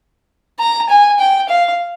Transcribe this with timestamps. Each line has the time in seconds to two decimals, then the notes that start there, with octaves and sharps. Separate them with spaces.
0.59 A#5
0.89 G#5
1.19 G5
1.49 F5